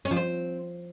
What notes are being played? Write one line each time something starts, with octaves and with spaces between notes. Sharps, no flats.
C#4
F3
C4